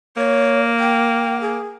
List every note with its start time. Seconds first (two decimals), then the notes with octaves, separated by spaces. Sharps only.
0.17 A#3 C#5
0.80 G5
1.41 G#4